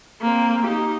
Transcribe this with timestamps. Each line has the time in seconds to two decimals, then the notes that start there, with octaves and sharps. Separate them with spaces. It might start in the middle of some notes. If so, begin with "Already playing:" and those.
0.21 A#3 C4
0.65 D#4 G4